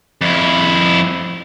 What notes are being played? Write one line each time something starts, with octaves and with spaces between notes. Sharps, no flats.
F2 E4